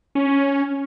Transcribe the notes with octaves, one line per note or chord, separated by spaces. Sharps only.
C#4